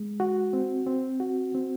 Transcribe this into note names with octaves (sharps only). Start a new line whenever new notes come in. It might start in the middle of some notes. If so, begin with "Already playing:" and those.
Already playing: G#3
F#4
C4
C4
F#4
C4